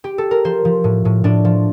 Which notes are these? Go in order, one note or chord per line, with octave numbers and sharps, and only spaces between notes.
G4
A4
A#4
F3 C5
F3
A2
A2
A2 D4
F3